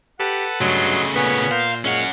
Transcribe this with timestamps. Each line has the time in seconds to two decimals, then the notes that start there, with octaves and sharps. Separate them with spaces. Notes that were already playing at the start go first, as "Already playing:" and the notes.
0.20 G4 A4 B4 F#5 A5
0.61 G2 C#3 F#3 A3 D#5 C6
1.16 A#2 B3 C#4 G#5
1.51 A#4 C5 F5
1.85 G#3 C#4 C#5 F5 F#5